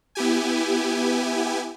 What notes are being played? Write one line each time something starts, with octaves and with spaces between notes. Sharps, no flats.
B3 E4 G4 G#5